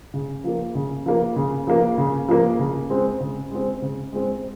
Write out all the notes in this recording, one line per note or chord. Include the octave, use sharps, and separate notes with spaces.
C#3
F3 A#3
C#3
F3 A#3
C#3
F3 A#3
C#3
F3 A#3
C#3
G#3 C4
C#3
G#3 C4
C#3
G#3 C4